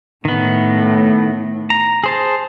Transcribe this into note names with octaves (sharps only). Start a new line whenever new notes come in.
A2 D#3 B3
A#5
G#4 C5 A5